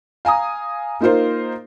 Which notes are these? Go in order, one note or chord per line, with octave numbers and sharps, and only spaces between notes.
F5 G#5 A#5 D#6
A#3 D#4 F4 A#4 C5